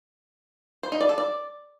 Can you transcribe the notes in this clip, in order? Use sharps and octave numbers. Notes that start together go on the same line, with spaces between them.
C5
D#4
D5
A4
D5